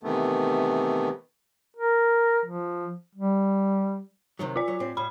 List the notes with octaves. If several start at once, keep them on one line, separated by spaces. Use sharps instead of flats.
C3 D#3 E3 A3 B3
A#4
F3
G3
C3 D#3 F#3
F4 D5
F#3
A2 C4
A2 B5